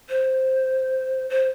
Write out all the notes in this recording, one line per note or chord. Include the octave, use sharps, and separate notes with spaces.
C5
C5